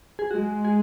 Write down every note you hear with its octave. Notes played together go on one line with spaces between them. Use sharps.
G#4
G#3 F#4
G#4